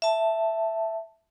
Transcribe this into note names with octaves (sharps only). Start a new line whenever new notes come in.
E5 A5